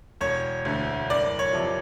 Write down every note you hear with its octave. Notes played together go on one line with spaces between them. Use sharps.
E1 C#5
D2 D3
F#1 D5
C#5
C3 F3